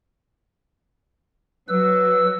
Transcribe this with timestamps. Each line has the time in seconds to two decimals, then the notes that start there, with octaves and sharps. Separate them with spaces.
1.69 F#3 B4 E6